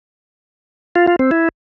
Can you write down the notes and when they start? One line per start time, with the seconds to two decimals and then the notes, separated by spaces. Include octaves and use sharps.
0.96 F4
1.07 F4
1.19 C4
1.31 E4